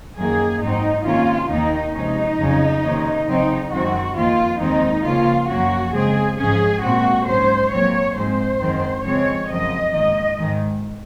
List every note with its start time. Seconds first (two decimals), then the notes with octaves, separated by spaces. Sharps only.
0.16 F#2 D#3 A#3 G#4
0.61 G#2 F#3 C4 D#4
1.05 C3 D#3 A#3 C#4 F4
1.49 D#2 D#3 A#3 D#4
1.94 C3 F3 G#3 C#4 D#4
2.38 F2 C#3 F#3 C#4
2.83 C3 D#3 A#3 C#4
3.28 C#3 F#3 C4 D#4
3.71 F#2 D#3 G#3 C4 F#4
4.16 F2 D#3 A#3 F4
4.60 D#2 D#3 G#3 C4 D#4
5.05 C#3 F3 A#3 C#4 F4
5.49 F#2 F3 A#3 C#4 F#4
5.93 C#3 G#3 C4 G#4
6.38 G#2 F3 G#3 C#4 G#4
6.82 A#2 G#3 C4 F#4
7.26 G#2 F#3 C#4 C5
7.71 A#2 F#3 C4 C#5
8.15 G#2 F3 G#3 C4 C5
8.60 F#2 D#3 G#3 C4
9.04 F2 C#3 F3 G#3 C4 C#5
9.48 F#2 C#3 F3 C4 D#5
9.92 G#2 D#3 A#3 D#5
10.36 G#2 D#3 G#3